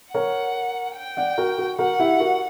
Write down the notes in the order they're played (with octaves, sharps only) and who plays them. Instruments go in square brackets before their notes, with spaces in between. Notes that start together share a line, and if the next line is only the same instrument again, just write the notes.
[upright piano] A#4 C#5 [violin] F#5
[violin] G5
[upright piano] D5 F#5
F#4 A#4
F#4 A#4
[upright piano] F#4 A#4 [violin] F#5
[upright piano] E4 G4
F#4 A#4